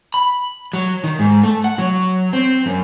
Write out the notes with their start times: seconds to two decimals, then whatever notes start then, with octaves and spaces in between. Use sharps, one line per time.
0.14 B5
0.73 F#3
1.04 D#3
1.19 G#2
1.44 A3
1.64 F#5
1.79 F#3
2.33 C4
2.66 F#2